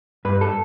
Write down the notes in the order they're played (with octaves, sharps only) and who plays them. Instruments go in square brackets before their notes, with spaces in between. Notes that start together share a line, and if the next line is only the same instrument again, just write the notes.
[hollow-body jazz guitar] G2 B4
A4